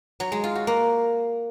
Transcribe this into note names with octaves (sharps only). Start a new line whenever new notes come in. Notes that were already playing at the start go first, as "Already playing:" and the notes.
F#3
G#3
F4
F#4
A#3